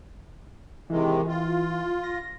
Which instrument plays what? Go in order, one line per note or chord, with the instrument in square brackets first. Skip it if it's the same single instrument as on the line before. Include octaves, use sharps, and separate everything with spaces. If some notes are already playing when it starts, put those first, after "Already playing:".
[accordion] C3 D#3 G#3 [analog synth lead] E3
[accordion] F4
[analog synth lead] A#6